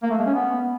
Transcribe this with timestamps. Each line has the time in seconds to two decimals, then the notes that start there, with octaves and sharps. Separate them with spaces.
0.03 A#3
0.11 A3
0.18 G#3
0.26 C#4
0.34 B3